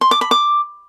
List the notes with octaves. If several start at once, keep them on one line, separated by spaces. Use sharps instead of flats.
C6
D6
B5
D6